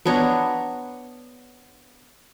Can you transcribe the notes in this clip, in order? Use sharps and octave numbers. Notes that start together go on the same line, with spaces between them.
B3 D4 C#5 A#5